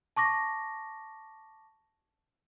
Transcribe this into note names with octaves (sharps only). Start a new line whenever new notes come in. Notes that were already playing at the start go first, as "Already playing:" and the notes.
A5 C#6 D6 A#6